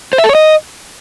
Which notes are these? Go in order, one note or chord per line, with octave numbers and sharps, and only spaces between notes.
C5
E5
A4
C#5
D#5